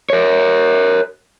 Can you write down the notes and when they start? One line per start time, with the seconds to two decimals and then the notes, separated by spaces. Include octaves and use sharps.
0.10 A#4 C#5